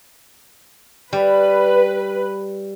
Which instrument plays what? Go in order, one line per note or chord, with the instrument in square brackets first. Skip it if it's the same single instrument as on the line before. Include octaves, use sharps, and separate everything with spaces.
[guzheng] G3 [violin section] B4